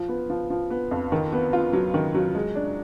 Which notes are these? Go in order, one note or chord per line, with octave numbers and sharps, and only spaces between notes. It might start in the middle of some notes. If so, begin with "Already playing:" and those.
Already playing: F3
B3
F3
F3
B3
F2
D#3
B3
F4
F#3
D#3
F#3
G#3
D4